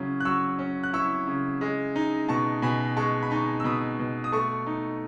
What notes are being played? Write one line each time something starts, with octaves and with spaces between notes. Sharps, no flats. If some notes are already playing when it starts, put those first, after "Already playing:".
Already playing: C#3 F#3 C#4 E4
F#6
F#3 C#6 E6
C#4
F#6
E4 C#6 E6
C#3
G#3
D#4
B2 A5 C#6
B2 G#5 B5
G#3 A5 C#6
B5
D#4 A5 C#6
E6
B2 B5 D#6
B2
D#6
A3 A5 C#6
D#4